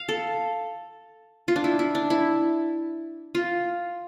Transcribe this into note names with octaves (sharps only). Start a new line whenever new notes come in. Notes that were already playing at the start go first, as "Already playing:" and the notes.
Already playing: F5
A4
F4
D4
E4
E4
D4
E4
F4